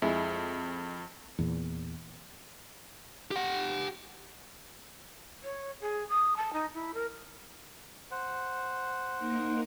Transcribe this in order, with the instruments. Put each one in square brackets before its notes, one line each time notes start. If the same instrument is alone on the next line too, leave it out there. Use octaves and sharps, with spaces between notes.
[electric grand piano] F2 [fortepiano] G#3 E4
[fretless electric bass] E2 A#2
[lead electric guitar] G4 F#5
[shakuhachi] C#5
G#4
D#6
A5
D#4
E4
A#4
[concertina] C5 F#5
[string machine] A#3 D#4 A#4